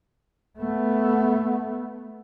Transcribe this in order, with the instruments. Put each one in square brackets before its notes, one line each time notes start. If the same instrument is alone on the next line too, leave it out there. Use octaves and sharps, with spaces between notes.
[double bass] A3 B3